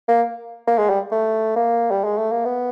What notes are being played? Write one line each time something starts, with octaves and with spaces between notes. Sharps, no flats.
A#3
A#3
G#3
G3
A3
A#3
G3
G#3
A3
A#3
B3